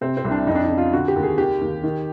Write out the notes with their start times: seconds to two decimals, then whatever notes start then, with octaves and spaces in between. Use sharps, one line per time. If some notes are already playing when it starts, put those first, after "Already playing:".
0.01 C3 C4
0.17 C4
0.25 C2
0.31 D4
0.47 F2 D#4
0.55 D4
0.63 D#4
0.70 C#3
0.78 F4
0.93 D3 F#4
1.08 G4
1.16 D#2
1.23 G#4
1.38 D#3 G4
1.61 D#2
1.83 D#3